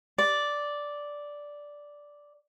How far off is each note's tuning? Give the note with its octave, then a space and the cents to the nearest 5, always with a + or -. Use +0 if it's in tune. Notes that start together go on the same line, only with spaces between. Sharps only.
D5 -5